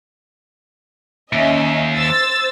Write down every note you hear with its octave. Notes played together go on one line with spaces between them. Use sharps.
D#2 C#4 D#5 E5
C5 E6 A6